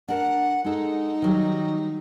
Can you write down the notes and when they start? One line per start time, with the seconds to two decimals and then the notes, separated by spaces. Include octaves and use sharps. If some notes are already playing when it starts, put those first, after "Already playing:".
0.08 D4 A#4 F#5
0.64 G#3 D#4 A4
1.22 D#3 F#3 G3